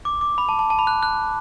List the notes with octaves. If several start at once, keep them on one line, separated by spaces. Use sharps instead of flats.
D6
D6
B5
A5
A5
A5
B5
F#6
F#6